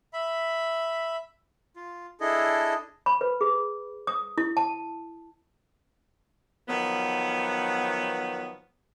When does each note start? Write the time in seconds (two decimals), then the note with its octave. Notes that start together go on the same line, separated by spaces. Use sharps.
0.13 E5 B5
1.76 F4
2.21 D4 E4 G#4 A4 D#5
3.06 B5
3.21 B4
3.41 G#4
4.07 D#6
4.38 E4
4.57 A5
6.69 D#3 F3 F#3 B3